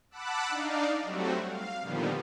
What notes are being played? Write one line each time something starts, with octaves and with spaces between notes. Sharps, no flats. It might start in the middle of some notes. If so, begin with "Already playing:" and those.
F#5 A5 B5 D6 E6 F#6
D4 D#4 D5 F5
F#3 G3 A3 C4 F#4
F5
A#2 D3 D#3 F3 G3 B3